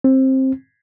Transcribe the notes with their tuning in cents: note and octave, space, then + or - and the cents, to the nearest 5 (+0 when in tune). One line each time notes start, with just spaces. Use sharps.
C4 +15